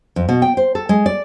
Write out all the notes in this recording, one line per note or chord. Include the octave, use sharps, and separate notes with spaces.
F2
B2
G5
C5
A4
G#3
D5